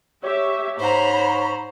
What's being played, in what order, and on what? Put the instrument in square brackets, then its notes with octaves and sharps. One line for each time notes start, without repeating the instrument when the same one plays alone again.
[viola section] G4 E5 [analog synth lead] C#5
[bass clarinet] G#2 [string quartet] C5 [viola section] A#5 B5